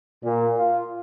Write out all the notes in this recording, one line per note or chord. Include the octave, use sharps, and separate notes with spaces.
A#2
F4